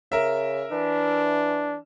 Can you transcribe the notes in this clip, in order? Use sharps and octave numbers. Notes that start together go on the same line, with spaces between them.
C#3 A#4 E5
E3 D4